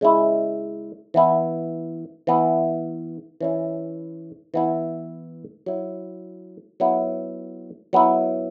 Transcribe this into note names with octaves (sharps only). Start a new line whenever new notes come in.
C#3 G#3 C#4 E4
E3 B3 E4
E3 B3 E4
E3 C#4 E4
E3 B3 E4
F#3 E4
F#3 B3 E4
F#3 B3 E4